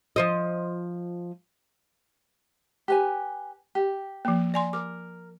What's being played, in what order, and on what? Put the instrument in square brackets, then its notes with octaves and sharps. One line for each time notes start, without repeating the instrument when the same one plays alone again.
[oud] F3 C5 D#5
[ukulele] G4 B4 G#5
G4
[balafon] F3 A#3
D5 G#5 C6
[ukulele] A#4 [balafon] D6